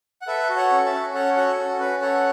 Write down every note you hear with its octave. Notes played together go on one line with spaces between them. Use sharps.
F#5
A4 B4 E5
F#4
C#5 F#5
C#4
E5 A5
C#4
A4 C#5 F#5
F#4 C#5 F#5
C#4 A4
C#4 B4
A4 C#5 F#5